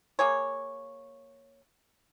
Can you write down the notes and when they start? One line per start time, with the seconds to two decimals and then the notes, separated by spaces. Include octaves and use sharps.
0.19 A#3 G#4 C#5